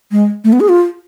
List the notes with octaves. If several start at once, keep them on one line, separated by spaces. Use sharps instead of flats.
G#3
A3
B3
G#4
F4